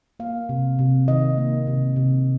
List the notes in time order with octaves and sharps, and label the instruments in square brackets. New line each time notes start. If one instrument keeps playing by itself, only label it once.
[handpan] A#3 F5
C3
C3
D#3 D#5
A#3
C3
C3